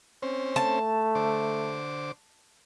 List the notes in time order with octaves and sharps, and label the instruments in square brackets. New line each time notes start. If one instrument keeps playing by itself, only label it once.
[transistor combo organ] C4 C#4 C5
[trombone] A3 [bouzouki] A5
[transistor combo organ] D3 C5 D6